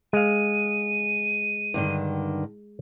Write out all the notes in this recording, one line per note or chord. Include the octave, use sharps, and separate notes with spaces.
G#3 F5 D#7
G2 D3 D#3